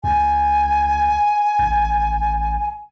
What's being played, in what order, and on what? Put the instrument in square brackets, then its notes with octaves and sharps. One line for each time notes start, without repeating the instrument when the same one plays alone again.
[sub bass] C#2 [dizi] G#5
[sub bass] A1